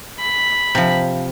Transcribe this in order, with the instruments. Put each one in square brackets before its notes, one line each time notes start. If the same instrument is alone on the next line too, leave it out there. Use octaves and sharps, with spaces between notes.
[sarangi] B5
[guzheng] C3 F3